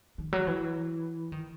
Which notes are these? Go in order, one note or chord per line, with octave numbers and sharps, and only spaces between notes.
D#3
F#3
E3
D#3